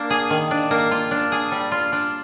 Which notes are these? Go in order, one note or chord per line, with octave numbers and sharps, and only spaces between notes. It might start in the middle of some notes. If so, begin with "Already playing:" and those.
Already playing: A#3 D4
G#4
D#3
D4
A#3
F4
D4
G#4
G3
F4
D4